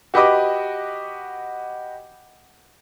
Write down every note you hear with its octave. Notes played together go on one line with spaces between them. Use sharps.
F#4 G4 B4 D#5 D6